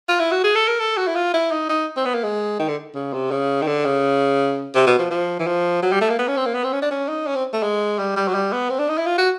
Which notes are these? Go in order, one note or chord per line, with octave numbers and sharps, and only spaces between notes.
F4
E4
F#4
G#4
A4
A#4
A4
F#4
E4
F4
E4
D#4
D#4
C4
B3
A#3
G#3
D#3
D3
C#3
C3
C#3
D#3
D3
C#3
C3
B2
F3
F3
E3
F3
F#3
G3
A3
A#3
B3
C#4
C4
A#3
B3
C4
C#4
D4
C#4
D#4
C#4
C4
A3
G#3
G3
G3
F#3
G3
B3
C4
D4
D#4
E4
F4
F#4